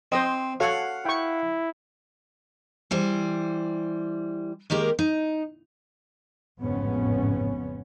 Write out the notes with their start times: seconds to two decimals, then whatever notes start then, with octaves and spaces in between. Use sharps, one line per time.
0.12 C4 C5 D#5
0.60 F#4 A4 C#5 F5 F#5
1.05 E4 G5 C#6
2.91 E3 G3 C5
4.70 D#3 G#3 A#3 G4 A#4
4.99 D#4
6.62 A1 F2 G#2 C#3 B3 C#4